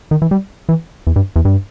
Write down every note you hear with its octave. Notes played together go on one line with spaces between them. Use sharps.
D#3
E3
G3
E3
E2
G2
E2
G2